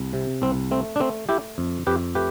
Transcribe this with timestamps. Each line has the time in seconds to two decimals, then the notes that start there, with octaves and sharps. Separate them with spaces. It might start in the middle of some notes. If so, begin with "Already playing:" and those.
Already playing: C2
0.13 C3
0.42 C2 C4
0.71 A3 C4
0.96 D4
1.00 A3 C4
1.29 A3 E4 G4
1.58 F2
1.87 F2 G4 B4
2.15 A3 G4 B4